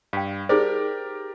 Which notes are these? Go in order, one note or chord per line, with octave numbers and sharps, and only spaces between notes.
G2 F5 G5
D#4 G4 G#4 A#4 C5 D5